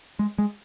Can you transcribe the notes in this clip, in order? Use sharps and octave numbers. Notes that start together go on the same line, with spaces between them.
G#3
G#3